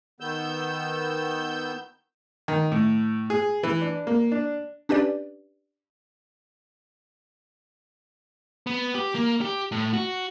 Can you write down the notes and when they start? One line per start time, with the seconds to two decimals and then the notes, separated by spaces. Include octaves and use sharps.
0.20 D#3 B3 E6 G6
2.48 D#3
2.72 A2
3.30 G#4
3.63 E3
3.82 D4
4.07 A#3
4.32 D4
4.89 C#4 D4 G4 B4 D5
8.67 B3
8.95 G4
9.15 A#3
9.41 G4
9.72 A2
9.93 F#4